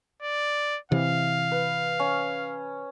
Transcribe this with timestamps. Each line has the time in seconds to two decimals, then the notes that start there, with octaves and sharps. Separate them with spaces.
0.22 D5
0.92 C3 E3 F5
1.52 B4
1.99 C#4